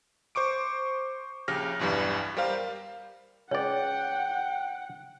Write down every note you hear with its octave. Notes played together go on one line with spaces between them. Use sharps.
C5 C#6 D6 D7
A#1 C#3 G4 F6 A#6
B1 E2 G2 E3 G3
G3 G4 A#4 C5 F5
C#2 C#5 D5 F#5 G5